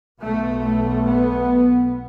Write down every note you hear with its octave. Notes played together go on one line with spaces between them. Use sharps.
B1 B2 A3
A3
B3